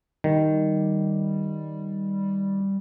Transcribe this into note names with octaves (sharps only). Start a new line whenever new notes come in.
D#3 G3